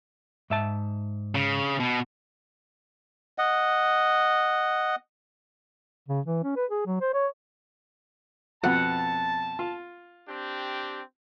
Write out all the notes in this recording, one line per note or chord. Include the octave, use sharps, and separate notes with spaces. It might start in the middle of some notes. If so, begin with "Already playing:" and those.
G#2 E5 A5
C#3
B2
D#5 F#5
C#3
E3
C#4
B4
G#4
F#3
C5
C#5
F2 B2 B3 F#5 A5
F4
C4 D4 G4